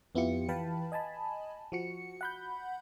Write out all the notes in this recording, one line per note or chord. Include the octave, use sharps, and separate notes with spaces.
F2 B3 E4 F4 G4 C#7
E3 B4 F5 G5 A5 B5
D#5 G#5 A5 B5
F3 F#4 C#7
F#5 B5 G6